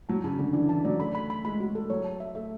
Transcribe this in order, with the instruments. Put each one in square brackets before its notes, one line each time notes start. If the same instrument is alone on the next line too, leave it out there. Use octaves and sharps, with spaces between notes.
[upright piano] F#3 [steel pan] A5
[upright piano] C#3 [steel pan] A5
[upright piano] D3 [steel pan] D4
[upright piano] E3 [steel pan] D4
[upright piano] E3 [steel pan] A5
[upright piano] F#3 [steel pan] D5
[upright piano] A3 [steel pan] B5
[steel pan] B5
B5
[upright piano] G#3 [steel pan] B5
[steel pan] F#4
A4
[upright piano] F#3 [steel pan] C#5
[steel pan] A5
E5
[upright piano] A3 [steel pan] E5